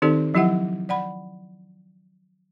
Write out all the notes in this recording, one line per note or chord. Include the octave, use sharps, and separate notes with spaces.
D#3 C4 D#4 G4 A4 D5
F3 F#3 E4 G4 E5 F#5
D5 F#5 B5